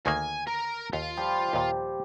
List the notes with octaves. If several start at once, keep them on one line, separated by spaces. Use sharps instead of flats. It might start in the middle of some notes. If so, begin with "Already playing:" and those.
D2 D#3 A#3 G#5
A#4
D#2 F4
F3 G3 G4
D#2 A#2